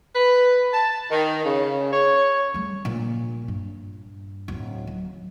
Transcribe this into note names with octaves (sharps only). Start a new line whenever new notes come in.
B4
A5
D#3
C#3
C#5
G3 A3
A#1 A#2
G2
D1
F#3